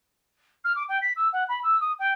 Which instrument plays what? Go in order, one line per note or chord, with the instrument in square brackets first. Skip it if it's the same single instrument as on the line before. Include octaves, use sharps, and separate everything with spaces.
[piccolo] F6
D6
G5
B6
E6
F#5
B5
E6
D#6
G5